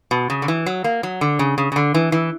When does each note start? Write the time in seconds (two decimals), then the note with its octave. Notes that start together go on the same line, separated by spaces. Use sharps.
0.11 B2
0.30 C#3
0.42 D3
0.48 E3
0.66 F#3
0.84 A#3
1.03 F#3
1.21 D3
1.39 C#3
1.58 C#3
1.72 C#3
1.76 D3
1.94 E3
2.12 E3